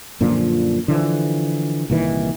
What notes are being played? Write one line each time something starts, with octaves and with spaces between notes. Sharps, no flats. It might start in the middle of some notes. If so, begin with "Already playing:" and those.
F#2 A#2 D3 F3
D3 E3 F3
C2 A#2 D#3 E3